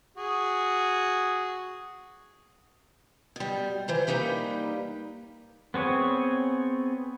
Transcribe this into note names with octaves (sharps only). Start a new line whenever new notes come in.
F#4 G#4
B2 G3
E3 C5 A#5
G3 A#3 D#4 G4 B4
B3 C4 G#4 C#5 G#5